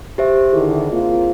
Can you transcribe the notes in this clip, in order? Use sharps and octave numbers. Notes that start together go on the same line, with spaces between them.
G4 C5 E5
D3 D#3 E4 G#4
A#3 C4 F4